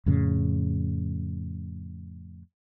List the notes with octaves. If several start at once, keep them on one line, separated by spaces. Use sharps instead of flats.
F2 A2 C#3